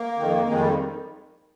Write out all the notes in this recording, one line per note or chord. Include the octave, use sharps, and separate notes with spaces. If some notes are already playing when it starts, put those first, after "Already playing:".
Already playing: A#3
F2 D#3
F2 D#3 G#3
G3